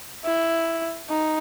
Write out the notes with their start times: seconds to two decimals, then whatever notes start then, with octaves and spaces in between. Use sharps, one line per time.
0.24 E4
1.10 D#4